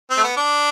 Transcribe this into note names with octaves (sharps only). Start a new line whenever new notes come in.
C4
A3
B3
D4